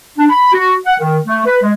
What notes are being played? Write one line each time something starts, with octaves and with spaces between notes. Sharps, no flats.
D4
B5
F#4
F#5
D#3
A3
B4
G#3